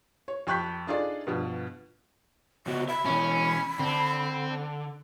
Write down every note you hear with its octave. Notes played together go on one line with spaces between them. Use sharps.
C#5
F2 G5 C#6 F#6 G6 B6
D4 D#4 F4 G#4 A4 D5
G2 B2 F3
C#3 B3 F#4
E5 B5
B2 E3 C#4
D3 C4